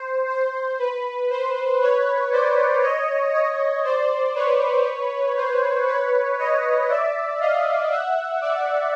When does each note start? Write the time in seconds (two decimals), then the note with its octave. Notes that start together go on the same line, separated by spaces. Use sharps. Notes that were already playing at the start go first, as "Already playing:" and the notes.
Already playing: C5
0.28 C5
0.79 B4
1.30 C5
1.81 B4 C#5
2.32 C5 D5
2.83 C#5 D#5
3.33 C#5 D#5
3.84 C5 D5
4.35 B4 C#5
5.37 C5
5.88 B4 C#5
6.38 C#5 D#5
6.90 D5 E5
7.40 D#5 F5
7.91 E5 F#5
8.42 D5 E5